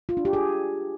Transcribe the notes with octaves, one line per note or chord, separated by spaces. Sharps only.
F4
D4
G4
G#4